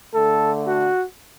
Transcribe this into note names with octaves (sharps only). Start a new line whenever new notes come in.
D3 A3 A4
F#4